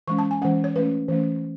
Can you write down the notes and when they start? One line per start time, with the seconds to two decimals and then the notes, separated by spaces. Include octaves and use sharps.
0.07 E3 G#3 C#4 C#6
0.19 A5
0.31 G#5
0.42 E3 G#3 C#4 F#5
0.64 C#5
0.76 E3 A3 C#4 B4
1.09 E3 A3 C#4